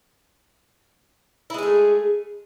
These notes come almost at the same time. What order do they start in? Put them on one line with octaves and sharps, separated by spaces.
E4 G#3 G#4 A3